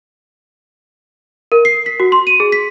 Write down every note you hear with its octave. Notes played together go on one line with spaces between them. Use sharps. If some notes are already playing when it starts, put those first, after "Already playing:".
A#4
C7
B6
F#4
C6
D#7
G#4
B6